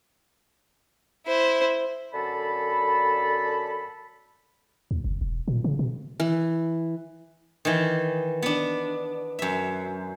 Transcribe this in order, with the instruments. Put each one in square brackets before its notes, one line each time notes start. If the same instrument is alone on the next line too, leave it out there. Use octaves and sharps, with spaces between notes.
[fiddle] E4 C5
[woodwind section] F#2 D3 A4 A5 B5
[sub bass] D#2
F#1
E1
A#2
C#3
B2
[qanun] E3
[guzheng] D#3 E3
B3 D4
F#2 E5